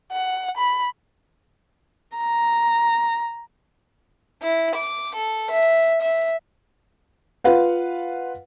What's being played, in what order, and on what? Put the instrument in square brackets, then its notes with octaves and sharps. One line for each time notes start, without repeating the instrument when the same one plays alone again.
[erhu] F#5
B5
[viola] A#5
[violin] E4
D6
A4
E5
E5
[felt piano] F4 B4 F5 F#5